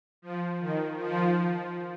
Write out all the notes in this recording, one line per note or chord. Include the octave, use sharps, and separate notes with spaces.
F3
D#3
F3